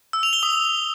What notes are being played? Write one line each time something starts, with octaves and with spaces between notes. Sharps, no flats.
E6
F7
G7
D#6